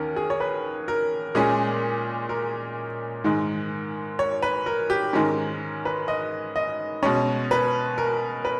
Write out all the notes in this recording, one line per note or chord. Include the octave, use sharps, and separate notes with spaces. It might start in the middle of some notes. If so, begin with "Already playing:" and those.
Already playing: D#2 D#3 C#4 A#4
G#4
C#5
B4
A#4
A#2 G#3 C#4 G#4
A#4
G#2 D#3 G#3
C#5
B4
A#4
G4
G#2 D#3 G#3 C#4 A#4
B4
D#5
D#5
B2 G#3 C#4 C#5
B4
A#4
B4